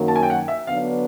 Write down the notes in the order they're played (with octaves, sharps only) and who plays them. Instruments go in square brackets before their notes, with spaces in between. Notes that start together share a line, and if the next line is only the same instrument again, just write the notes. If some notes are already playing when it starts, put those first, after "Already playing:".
Already playing: [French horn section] F#2 D#3 F#3 A#3
[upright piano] A5
G#5
G5
F#5
E5
[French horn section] D3 F#3 B3 D4 [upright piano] F5